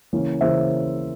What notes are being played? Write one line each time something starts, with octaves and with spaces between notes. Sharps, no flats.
C#3 E3 A#3 C#4
C#3 E3 A#3 C#4 C5 E5